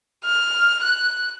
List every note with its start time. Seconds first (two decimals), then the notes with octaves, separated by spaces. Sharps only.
0.25 F6
0.83 F#6